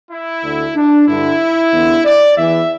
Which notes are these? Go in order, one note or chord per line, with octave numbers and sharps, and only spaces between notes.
E4
D2 D3
D4
G2 D3 E4
E2 D3
D5
E2 E3 E5